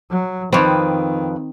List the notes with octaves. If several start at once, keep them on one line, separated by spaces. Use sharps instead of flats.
F#3
F2 D#3 C4 B4